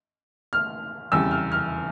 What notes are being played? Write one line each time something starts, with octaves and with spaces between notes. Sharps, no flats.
F6
F1 E2 C#3 G3 E6
F6
F6